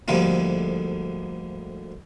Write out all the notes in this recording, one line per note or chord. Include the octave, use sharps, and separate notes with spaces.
D2 G#2 D3 F3 G3 A#3